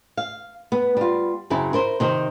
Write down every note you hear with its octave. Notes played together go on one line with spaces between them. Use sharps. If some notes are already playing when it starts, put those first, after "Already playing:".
F5
B3
G3 F4
F#2 C#3 C4 E4
E4 A#4 C5
C3 D#3 C5